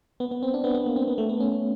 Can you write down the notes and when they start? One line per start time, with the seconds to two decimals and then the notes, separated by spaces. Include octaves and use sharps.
0.20 B3
0.31 B3
0.43 C4
0.54 D4
0.64 B3
0.74 B3
0.86 A#3
0.96 C4
1.08 B3
1.18 A3
1.29 B3
1.40 C#4